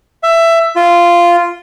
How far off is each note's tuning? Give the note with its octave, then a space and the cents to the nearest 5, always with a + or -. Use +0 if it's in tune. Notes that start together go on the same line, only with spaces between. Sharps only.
E5 +15
F4 -10